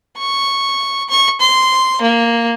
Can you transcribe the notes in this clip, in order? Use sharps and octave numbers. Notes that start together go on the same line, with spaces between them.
C#6
C#6
C6
A#3